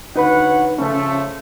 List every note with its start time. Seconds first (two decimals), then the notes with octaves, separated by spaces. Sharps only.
0.16 D2 D#4 B4 C#5 F#5 B5
0.79 C#3 F3 A3 C#4